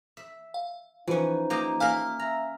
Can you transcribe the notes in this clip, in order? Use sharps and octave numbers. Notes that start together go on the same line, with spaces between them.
E5
F5
E3 F3 C#4 D#4 B4
A#3 G4 D#5
A#3 E5 F5 G#5 F6
E5 A#5